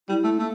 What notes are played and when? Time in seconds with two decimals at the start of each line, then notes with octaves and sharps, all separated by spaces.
0.09 G3 E4
0.23 A3
0.39 A3 A#3